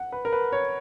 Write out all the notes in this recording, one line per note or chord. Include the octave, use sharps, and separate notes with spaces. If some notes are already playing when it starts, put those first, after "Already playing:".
Already playing: F#5
B4
A#4
B4
C#5